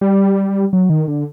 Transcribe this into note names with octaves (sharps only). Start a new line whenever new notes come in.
G3
F#3
D#3
D3